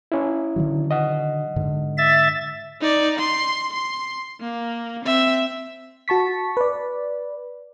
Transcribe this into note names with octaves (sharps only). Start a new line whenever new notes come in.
C#4 E4
D3 D#3 F#3
D#5 F#5
G#2 D3
E5 A6
D#4 D5
C6
C6
A#3
C4 E5
F#4 A5 C#6 B6
B4 D5